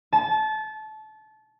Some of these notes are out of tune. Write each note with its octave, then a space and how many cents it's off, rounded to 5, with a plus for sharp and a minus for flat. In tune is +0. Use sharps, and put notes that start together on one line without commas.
A5 -25